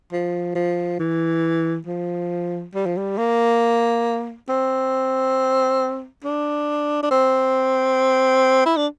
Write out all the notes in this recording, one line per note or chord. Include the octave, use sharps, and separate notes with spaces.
F3
F3
E3
F3
G3
F3
G3
A#3
C4
D4
D4
C4
E4
D4